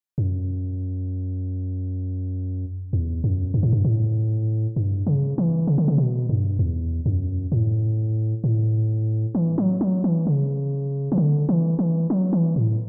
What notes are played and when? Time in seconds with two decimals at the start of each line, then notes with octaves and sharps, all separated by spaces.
0.18 F#2
2.93 E2
3.24 F#2
3.54 G2
3.63 A2
3.72 G2
3.85 A2
4.76 G2
5.07 C#3
5.38 E3
5.67 C#3
5.78 D3
5.88 C#3
5.98 B2
6.29 G2
6.59 E2
7.06 F#2
7.52 A2
8.44 A2
9.35 E3
9.58 F#3
9.81 F#3
10.04 E3
10.27 C#3
11.12 E3
11.18 D3
11.49 E3
11.79 E3
12.10 F#3
12.33 E3
12.56 A2